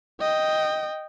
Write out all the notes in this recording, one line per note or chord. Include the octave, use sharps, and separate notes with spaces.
D#5 G5